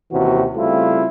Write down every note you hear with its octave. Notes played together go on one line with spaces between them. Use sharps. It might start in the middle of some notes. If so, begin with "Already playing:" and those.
D#2 C3 E3 C#4 F#4
C#3 G3 A3 C4 E4 F4